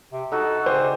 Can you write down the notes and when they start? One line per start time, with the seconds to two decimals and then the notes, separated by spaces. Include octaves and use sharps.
0.13 C3
0.32 D#4 F#4 A4
0.66 C#3 G4 C5 G#5